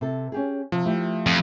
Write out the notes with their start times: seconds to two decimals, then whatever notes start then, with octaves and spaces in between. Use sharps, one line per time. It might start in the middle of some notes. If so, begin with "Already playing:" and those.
0.01 C3 A4
0.32 C#4 G4 G#4
0.72 C3 F3
0.85 A3 E4 G4
1.26 F2